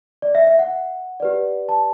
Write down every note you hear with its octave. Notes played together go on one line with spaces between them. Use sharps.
D5
E5
E5
F#5
G4 B4 D5
A5